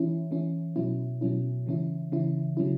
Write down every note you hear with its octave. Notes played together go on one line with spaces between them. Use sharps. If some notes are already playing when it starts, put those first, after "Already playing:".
Already playing: E3 C#4 E4
E3 C#4 E4
B2 F#3 C#4 E4
B2 F#3 C#4 E4
C#3 E3 C#4 E4
C#3 E3 C#4 E4
C#3 F#3 C#4 E4